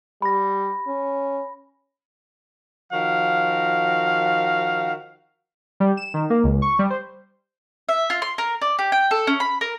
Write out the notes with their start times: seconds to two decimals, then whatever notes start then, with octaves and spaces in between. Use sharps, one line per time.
0.22 G3 B5 A#6
0.87 C#4
2.93 D#3 F3 F#4 F5
5.80 G3
5.97 E7
6.14 D#3
6.30 A#3
6.44 C#2
6.62 C#6
6.79 G3
6.90 C5
7.89 E5
8.10 F4
8.22 C6
8.38 A#4
8.61 D5
8.79 G4
8.92 G5
9.11 A4
9.27 C#4
9.40 B5
9.61 A#4